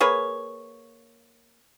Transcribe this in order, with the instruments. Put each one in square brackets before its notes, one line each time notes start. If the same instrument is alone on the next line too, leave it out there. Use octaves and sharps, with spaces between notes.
[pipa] A#3 G#4 B4 C#5